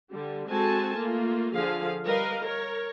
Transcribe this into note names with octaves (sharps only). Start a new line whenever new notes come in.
D3 G3
G#3 C4 F#4 A4 G#5 A5
A3 A#3 F4
D3 F3 G#4 F5
G3 A#4 B4 D#5 F5
A#4 C#5